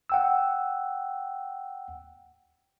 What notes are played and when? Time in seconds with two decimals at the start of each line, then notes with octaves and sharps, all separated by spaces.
0.10 F#5 G5 E6